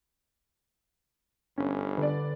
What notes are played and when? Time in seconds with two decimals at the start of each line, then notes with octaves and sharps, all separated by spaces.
1.58 G1 C#4
1.98 D3 B4 D5